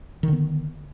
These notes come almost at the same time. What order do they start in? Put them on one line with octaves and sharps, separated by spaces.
D#3 D3 B3